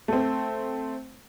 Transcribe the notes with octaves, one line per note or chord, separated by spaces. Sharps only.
A3 C4